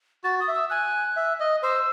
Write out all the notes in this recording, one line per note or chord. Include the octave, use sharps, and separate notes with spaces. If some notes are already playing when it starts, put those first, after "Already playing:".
F#4 A6
D#6
E5
E6
G#5 F#6
E5
D#5
C5 E6